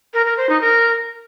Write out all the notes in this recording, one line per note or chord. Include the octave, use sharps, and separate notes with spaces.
A#4
A#4
C5
D#4
A#4